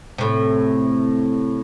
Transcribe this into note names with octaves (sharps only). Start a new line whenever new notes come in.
A2 C3